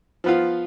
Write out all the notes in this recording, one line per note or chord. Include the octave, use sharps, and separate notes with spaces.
F3 B3 F4